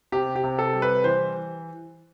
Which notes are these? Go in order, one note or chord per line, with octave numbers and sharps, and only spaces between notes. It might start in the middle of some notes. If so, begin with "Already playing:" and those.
C3 G4
G4
C3
A4
G3
B4
E3 C5